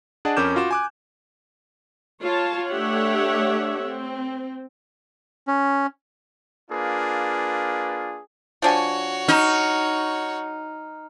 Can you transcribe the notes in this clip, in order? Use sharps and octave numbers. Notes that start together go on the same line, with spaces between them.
D4 G#4 D5 D#5 F#5 A5
F2 C#4 A#4 D6 G6 E7
F4 F#4 D6 E7
G#5 D6 F#6
F4 C#5 A5
A3 D4 G4 C#5 E5 F#5
C4
C#4
A#3 D4 F4 G#4 B4
F3 D4 F#4 C#5 G#5
D#4 A#5 F6